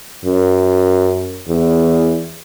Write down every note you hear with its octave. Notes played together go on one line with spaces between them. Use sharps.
F#2
E2